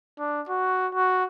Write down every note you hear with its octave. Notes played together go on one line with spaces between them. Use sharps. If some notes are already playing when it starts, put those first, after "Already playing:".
D4
F#4
F#4